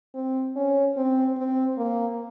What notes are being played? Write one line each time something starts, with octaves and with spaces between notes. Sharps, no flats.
C4
C#4
C4
C4
A#3